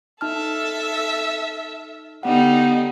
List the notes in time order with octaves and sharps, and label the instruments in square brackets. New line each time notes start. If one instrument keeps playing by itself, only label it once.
[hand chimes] D#4 A5 F6 [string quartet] A4 E5
[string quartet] D3 G3 D#4 [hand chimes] B3 F#5